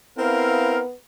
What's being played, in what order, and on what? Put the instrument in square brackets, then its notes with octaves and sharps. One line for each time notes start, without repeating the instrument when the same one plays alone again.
[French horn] B3 [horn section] C4 E4 F5 [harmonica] A#4